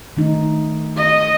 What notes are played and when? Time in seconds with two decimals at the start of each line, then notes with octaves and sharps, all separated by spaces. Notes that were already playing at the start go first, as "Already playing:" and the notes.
0.17 D#3 A3 D#4
0.97 D#5